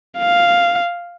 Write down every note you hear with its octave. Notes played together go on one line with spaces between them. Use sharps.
F5